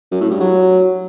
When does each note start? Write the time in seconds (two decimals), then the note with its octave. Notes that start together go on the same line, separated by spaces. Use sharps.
0.11 F#2
0.21 A2
0.30 G2
0.40 F#3